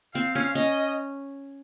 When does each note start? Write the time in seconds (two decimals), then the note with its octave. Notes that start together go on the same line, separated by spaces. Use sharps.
0.15 C4 F5
0.35 C#4
0.55 C#4 D#5